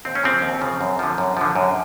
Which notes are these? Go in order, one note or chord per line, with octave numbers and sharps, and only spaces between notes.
D#2 C4
C#4
C#3 F3 C4
D#2
C#3 F3
F#2
D3 F3
F#2
D3 F3
F#2